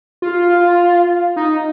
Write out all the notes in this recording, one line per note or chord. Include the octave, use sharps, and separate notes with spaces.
F4
D#4